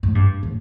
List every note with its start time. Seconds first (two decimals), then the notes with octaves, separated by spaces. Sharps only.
0.03 A2
0.15 G2
0.43 A2